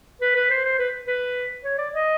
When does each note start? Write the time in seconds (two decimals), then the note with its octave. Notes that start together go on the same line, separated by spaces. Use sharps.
0.22 B4
0.36 B4
0.50 C5
0.65 C5
0.79 B4
1.07 B4
1.65 C#5
1.78 D5
1.94 D#5